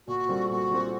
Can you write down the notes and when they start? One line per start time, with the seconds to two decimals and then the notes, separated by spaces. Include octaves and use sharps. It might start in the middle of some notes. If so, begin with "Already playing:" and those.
0.07 A#2 F#4
0.29 G3 C4 F4 A4
0.50 A#2 F#4
0.71 G3 C4 F4 A4